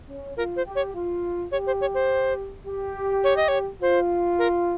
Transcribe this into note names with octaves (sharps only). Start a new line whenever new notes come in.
C#4
F4 A#4
C5
G4
C#5
F4
G4 C#5
C5
C#5
C5
G4
C#5
D#5
C#5
F4 C5
A#4